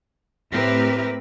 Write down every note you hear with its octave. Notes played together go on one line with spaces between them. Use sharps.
A2 C4 G4 A#4 B4 E5